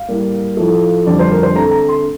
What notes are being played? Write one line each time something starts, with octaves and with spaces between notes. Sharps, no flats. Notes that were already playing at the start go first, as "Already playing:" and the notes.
Already playing: F5
A2 G3 A#3
A2 F3 A3
F2 D3 G3 D5
C5
A#4
C5
D3 A3 C4 A#5
A#5
C6